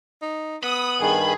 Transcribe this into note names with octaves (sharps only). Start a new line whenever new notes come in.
D#4
B3 B5 D#6
G2 D#3 G#4